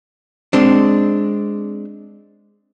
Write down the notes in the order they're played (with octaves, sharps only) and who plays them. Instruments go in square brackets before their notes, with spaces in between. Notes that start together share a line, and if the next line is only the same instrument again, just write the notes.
[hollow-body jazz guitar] G#3 C4 D4